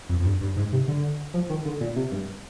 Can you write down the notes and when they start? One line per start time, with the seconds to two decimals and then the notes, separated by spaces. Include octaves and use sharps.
0.09 F2
0.20 F2
0.26 G2
0.41 G2
0.57 G#2
0.73 C3
0.88 D3
1.34 F3
1.50 D#3
1.65 D3
1.81 A#2
1.96 C3
2.12 G2